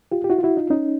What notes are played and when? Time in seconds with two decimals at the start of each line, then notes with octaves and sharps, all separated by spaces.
0.12 F4 G4
0.24 G4
0.30 E4 F#4
0.38 F4
0.43 E4 F#4
0.57 D#4 F4
0.70 C#4 D#4